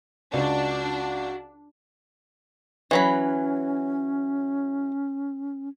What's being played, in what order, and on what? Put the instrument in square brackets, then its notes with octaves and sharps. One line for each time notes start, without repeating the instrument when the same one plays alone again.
[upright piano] C#2 D5 [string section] D4 [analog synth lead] F#4
[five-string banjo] E3 F#3 B5 [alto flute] C#4